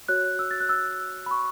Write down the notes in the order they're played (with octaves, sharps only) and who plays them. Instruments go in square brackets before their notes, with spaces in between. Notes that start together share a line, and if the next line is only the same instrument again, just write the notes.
[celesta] F#4 C#5 F#6
E6
A6
F#6
E6
B5
C#6